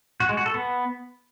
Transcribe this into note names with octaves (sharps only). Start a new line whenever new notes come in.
F#4
G#3
F#4
A4
B3